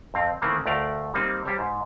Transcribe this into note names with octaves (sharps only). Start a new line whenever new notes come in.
F2 C4 F5
D#3 E3 A3 A#3 C4
D2 A3 A#4 D5 F5
G3 A#3 C4 D#4
G3 G4 C5 C#5
G#2